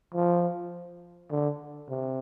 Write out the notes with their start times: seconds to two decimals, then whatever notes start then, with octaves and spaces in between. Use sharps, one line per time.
0.14 F3
1.31 D3
1.89 C3